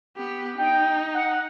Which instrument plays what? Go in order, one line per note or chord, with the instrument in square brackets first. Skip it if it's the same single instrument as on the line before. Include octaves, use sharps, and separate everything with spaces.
[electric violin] B3 G4
[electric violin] D#4 [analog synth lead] G5
[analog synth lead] F#5